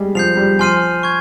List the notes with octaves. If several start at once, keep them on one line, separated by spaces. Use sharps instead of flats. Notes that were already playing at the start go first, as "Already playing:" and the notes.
Already playing: G3 G#3
F3 G6 C7 F7
G3
F3 G#5 C6 F6 C7 D#7
C#6 G#6